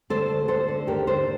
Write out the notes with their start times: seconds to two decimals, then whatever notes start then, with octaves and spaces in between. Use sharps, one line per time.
0.10 D2 A4 C5
0.30 D2
0.48 D2 A4 C5
0.68 D3
0.87 D#2 G4 A#4
1.07 D3 A4 C5